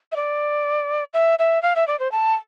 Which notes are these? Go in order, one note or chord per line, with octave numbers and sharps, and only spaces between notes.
E5
D5
E5
E5
F5
E5
D5
C5
A5